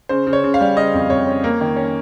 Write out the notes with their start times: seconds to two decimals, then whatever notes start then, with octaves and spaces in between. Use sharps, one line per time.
0.09 C#3 C5
0.27 C#3
0.33 C#5
0.44 C#3
0.54 F5
0.61 G3
0.77 C#3 D#5
0.94 F2
1.10 F2 C#5
1.27 C#4
1.44 A#3
1.61 D#3
1.76 C#4